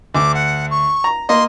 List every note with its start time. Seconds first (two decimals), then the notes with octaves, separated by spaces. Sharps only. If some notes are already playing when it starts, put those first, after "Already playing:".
0.15 D2 D6
0.34 F#5
0.71 C#6
1.04 A#5
1.29 A#3 D#5 C6